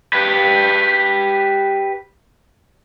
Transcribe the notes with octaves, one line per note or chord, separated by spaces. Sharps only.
G4 B4